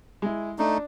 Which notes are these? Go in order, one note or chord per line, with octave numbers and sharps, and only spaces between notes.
G#3 E4
A3 D4 D#4